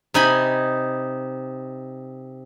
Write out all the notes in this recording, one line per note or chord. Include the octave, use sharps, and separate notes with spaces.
C3 D#4 G#5 B5